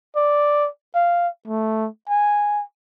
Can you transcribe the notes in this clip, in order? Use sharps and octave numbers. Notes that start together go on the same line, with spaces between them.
D5
F5
A3
G#5